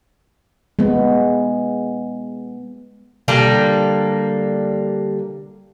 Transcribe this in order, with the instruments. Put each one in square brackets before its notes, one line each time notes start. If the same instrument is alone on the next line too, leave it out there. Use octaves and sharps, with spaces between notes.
[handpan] G#3 B3
[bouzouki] D3 G3 A#3 D4